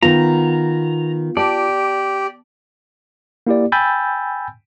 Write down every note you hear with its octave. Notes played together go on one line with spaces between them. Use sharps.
D#3 B3 F4 A#5
G4 D5 A5
A#3 E4 G4 D5
G5 G#5 B5 E6 G6 A6